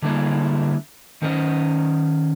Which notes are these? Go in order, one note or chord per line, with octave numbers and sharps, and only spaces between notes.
D3 G3 A#3 D4 E4 G#4
D#3 C#4 A#4 C5 D5 D#5